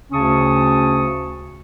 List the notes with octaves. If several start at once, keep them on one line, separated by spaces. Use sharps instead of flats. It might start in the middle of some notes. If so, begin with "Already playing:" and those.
D2 C#3 C#4 A5 C#6 D#6